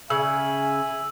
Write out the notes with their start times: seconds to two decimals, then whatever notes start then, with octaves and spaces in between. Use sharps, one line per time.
0.10 C#3 E5 G#5 E6